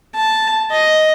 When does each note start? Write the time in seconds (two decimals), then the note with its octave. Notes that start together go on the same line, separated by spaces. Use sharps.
0.15 A5
0.71 D#5